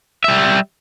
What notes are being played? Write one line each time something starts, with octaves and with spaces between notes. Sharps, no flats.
G3 E5